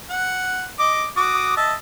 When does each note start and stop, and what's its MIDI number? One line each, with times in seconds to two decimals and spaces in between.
0.10 0.66 78
0.79 1.06 75
0.79 1.06 86
1.17 1.53 66
1.17 1.53 86
1.17 1.53 87
1.57 1.74 75
1.57 1.74 76
1.57 1.74 81